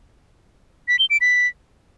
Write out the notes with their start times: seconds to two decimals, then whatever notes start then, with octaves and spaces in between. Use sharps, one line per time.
0.88 B6
0.99 G7
1.10 D7
1.21 B6